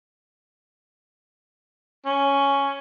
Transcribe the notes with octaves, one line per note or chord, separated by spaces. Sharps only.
C#4